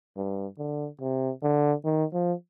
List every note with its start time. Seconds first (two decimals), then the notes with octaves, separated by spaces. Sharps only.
0.17 G2
0.58 D3
1.01 C3
1.43 D3
1.84 D#3
2.13 F3